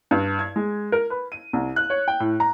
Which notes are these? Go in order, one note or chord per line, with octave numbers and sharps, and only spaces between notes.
G2
G#6
G#3
A#4
B4
D#7
C2
F#6
C#5
G5
A2
A#5